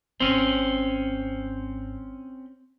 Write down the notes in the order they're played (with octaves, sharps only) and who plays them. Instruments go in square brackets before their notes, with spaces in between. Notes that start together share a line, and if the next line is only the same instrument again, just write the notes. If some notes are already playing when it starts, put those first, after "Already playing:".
[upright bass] G#1 [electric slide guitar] C4 C#4